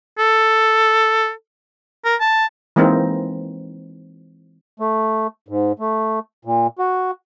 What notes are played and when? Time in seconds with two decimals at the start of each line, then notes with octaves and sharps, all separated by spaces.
0.19 A4
2.05 A#4
2.21 A5
2.76 E3 G#3 A#3 C4 D#4
4.80 A3
5.48 G#2
5.79 A3
6.45 A#2
6.79 F#4